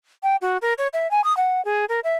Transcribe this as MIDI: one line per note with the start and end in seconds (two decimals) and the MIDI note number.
0.23 0.36 79
0.41 0.57 66
0.62 0.73 70
0.78 0.87 73
0.93 1.09 76
1.11 1.23 80
1.24 1.35 87
1.37 1.63 78
1.65 1.85 68
1.89 2.00 70
2.04 2.17 76